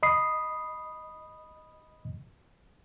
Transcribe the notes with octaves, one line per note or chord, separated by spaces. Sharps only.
D#5 B5 D#6 C7